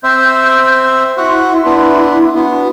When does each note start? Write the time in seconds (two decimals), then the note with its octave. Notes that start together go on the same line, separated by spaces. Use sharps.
0.04 C4 C5 E5 G6
1.17 E4 F#4 E5 F#5 C6
1.65 B3 D4 B4
2.35 B3 D4 F#4